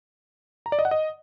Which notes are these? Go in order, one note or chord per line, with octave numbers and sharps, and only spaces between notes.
A#5
D5
D#5
F#5
D#5